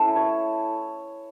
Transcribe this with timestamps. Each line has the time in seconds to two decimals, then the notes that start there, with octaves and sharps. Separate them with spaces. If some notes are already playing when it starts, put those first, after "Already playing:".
Already playing: A3 C#4 E4 A5
0.16 C#5